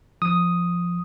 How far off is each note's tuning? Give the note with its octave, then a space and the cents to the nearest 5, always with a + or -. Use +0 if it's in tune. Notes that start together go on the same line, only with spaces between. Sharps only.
F3 +0 D#6 +0